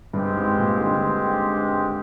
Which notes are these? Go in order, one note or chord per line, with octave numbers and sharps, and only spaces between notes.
G2 G#3 C4 G4
G#2
A#2
D3